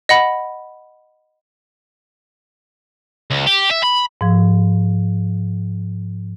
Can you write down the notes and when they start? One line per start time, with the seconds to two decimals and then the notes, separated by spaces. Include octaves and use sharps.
0.09 D#5 F#5 B5
3.30 C#2
3.47 G4
3.71 E5
3.84 B5
4.21 G#2 F3